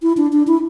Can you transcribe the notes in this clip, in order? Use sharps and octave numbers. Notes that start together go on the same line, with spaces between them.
E4
D4
D4
E4